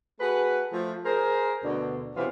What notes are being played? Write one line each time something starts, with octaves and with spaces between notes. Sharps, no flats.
A3 F#4 G#4 B4
F3 A3
G#4 A#4 C5
D2 B2 D3
F#2 C3 E3 B3 F4 C5